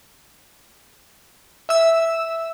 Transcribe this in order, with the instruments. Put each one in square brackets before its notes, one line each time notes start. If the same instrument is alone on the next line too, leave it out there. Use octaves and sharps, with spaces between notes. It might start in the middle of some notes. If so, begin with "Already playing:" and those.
[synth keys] E5 E6